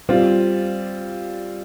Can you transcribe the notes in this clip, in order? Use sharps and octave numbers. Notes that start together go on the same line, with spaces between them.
G3 C4 F4